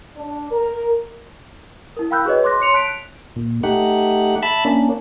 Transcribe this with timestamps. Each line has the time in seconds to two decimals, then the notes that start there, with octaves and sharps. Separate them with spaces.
0.17 D4
0.51 A#4
1.97 E4 A#4
2.11 F5 G5 B5 E6 F#6 G6
2.25 F#4 G#4 B4 C#5 D#5
2.44 C6 D6 F#6 A#6
2.59 C#5 C6 C#7 F7
2.73 A5 F#6 B6 D7 F7
3.36 A#2
3.63 A3 D#4 G4 F#5
4.43 E5 A5 B5
4.65 A#3 C#4 D4